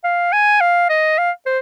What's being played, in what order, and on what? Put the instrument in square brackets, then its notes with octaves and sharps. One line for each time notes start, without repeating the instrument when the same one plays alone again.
[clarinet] F5
G#5
F5
D#5
F5
C5